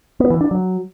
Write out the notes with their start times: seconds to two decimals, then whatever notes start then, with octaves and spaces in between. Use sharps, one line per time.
0.20 B3
0.30 E3
0.41 D4
0.51 F#3